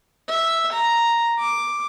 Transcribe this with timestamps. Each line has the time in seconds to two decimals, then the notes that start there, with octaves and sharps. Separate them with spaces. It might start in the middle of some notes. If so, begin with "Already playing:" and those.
0.29 E5
0.73 A#5
1.40 D6